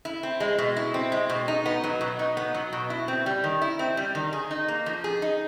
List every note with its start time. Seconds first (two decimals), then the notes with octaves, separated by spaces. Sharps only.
0.05 E4
0.23 C4
0.40 G#3
0.58 B2
0.76 E4
0.94 C4
1.12 G#3
1.29 B2
1.48 D#4
1.66 B3
1.84 F#3
2.01 B2
2.19 D#4
2.37 B3
2.54 F#3
2.73 B2
2.90 E4
3.08 C4
3.26 G3
3.44 D#3
3.62 E4
3.79 C4
3.97 G3
4.15 D#3
4.33 G#4
4.51 D#4
4.68 A#3
4.86 F3
5.04 G#4
5.22 D#4